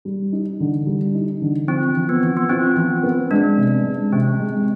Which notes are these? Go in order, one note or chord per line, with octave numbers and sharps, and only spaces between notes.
G3
D#4
D3
G3
D#4
D3
F3 C4
F3
B3
F3
B3
C4 F4
F3
B3
G#3 D4
C3
G#3
C3 C4
G#3